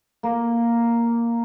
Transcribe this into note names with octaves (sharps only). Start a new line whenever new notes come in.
A#3